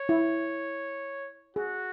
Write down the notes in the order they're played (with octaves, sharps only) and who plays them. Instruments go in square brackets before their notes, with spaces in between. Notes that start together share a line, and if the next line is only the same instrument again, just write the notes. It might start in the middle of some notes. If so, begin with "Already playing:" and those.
Already playing: [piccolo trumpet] C#5
[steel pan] E4
[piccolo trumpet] F#4 [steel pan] G#4